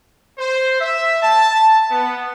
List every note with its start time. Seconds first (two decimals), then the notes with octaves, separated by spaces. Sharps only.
0.39 C5
0.80 E5
1.22 A5
1.91 B3